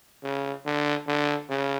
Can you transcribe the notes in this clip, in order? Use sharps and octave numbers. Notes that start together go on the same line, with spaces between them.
C#3
D3
D3
C#3